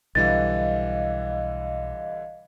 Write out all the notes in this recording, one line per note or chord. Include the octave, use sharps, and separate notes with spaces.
B1 D3 E3 G3 D#5 F5 A6